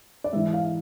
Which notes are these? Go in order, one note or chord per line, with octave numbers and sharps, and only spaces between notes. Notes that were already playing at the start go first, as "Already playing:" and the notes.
D5
G#2 E3 E5
F5